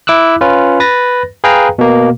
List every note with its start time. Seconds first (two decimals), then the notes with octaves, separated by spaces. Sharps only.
0.07 E4 D6 E6 F#6
0.41 C#4 F4 B4
0.80 B4 A6 A#6
1.44 G#4 B4 F5 G5 A#5
1.78 B2 A#3